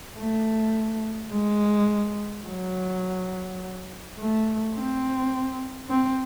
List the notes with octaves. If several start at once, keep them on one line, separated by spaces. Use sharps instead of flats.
A3
G#3
F#3
A3
C4
C4